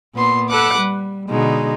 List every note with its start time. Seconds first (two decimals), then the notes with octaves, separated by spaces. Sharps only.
0.16 A#2 B3 C6
0.50 A4 B4 F#5 D6 F#6
0.79 G3
1.29 B2 D3 G#3 D#4